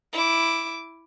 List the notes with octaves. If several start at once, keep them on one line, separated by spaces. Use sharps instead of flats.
E4 D6